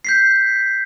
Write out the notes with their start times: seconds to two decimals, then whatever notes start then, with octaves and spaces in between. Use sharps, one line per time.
0.05 G6 B6 C7